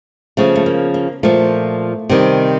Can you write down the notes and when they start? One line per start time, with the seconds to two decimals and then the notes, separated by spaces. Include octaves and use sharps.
0.37 C#3 F3 A3
0.56 A3
0.66 A#3
0.94 A#3
1.23 A#2 F3 A3
2.09 C3 D#3 G3